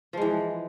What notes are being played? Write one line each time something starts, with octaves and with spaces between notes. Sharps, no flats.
E3 F3 G#3